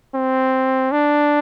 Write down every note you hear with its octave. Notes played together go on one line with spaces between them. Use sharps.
C4
D4